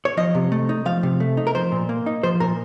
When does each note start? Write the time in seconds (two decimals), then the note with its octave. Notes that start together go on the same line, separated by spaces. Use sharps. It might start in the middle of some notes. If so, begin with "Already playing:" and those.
0.05 C#5
0.17 F3 D#5
0.35 C3
0.52 A3
0.69 D#4
0.86 F3 F5
1.03 C3
1.20 A3
1.37 D#4
1.47 A#4
1.55 F3 C5
1.72 A#2
1.89 A#3
2.06 D#4
2.23 F3 C5
2.40 A#2 A#4